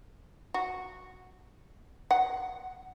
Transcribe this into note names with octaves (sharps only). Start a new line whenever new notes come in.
F#4
F#5